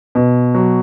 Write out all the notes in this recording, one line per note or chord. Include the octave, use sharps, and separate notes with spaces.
B2
F#3